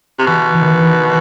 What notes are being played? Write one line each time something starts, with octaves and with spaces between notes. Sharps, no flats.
C3
B2 E3
E3
D#3
E3
E3